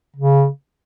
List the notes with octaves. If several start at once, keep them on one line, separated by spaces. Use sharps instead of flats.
C#3